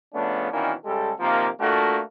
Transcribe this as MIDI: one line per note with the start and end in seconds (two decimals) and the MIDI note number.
0.15 0.50 49
0.15 0.50 53
0.15 0.50 57
0.15 0.50 59
0.15 0.50 61
0.15 0.50 62
0.52 0.73 47
0.52 0.73 51
0.52 0.73 52
0.52 0.73 58
0.52 0.73 61
0.52 0.73 62
0.85 1.11 49
0.85 1.11 55
0.85 1.11 56
0.85 1.11 67
0.85 1.11 69
1.20 1.47 48
1.20 1.47 51
1.20 1.47 53
1.20 1.47 58
1.60 2.00 57
1.60 2.00 58
1.60 2.00 62
1.60 2.00 65
1.60 2.00 66
1.60 2.00 69